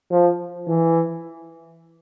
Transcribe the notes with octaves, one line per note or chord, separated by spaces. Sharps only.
F3
E3